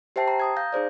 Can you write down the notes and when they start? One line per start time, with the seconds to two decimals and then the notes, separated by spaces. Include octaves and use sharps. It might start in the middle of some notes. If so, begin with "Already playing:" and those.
0.16 G4 C5 E5 G5 A5 C7
0.28 A#5
0.40 A#5 D#6 G#6
0.57 F5 G6 A#6
0.73 D#4 G#4 C5 D5